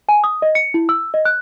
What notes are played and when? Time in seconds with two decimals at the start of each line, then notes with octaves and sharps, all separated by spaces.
0.09 G#5
0.24 D#6
0.42 D#5
0.55 C#7
0.74 E4
0.89 E6
1.14 D#5
1.25 F#6